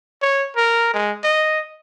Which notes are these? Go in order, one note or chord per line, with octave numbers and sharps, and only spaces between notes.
C#5
A#4
G#3
D#5